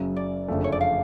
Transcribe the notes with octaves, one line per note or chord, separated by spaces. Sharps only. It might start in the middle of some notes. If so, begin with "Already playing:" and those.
Already playing: F#1 F#2 C#3 F#3
D5
F#1 F2 D3 F3 A3
C#5
D5
F5